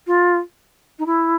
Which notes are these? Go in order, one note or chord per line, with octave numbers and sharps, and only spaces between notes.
F4
D#4
E4